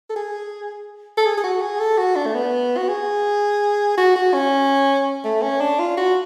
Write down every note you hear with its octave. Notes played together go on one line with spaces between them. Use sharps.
A4
G#4
A4
G#4
G#4
F#4
G#4
A4
F#4
D4
A3
B3
F#4
G#4
F#4
F#4
C#4
A3
C#4
D4
F4
F#4